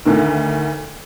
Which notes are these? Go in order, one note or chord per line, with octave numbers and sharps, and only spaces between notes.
D2 D3 D#3